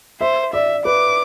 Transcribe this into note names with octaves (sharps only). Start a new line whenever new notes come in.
C5 E5
D5 E5
B4 D6